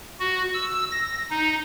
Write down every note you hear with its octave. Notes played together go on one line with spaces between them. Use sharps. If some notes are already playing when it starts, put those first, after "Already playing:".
F#4
E6
A#6
D#4